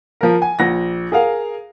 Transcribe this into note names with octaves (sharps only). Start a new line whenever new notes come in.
F3 A#4
G#5
A#1 A#6
G#4 A#4 F5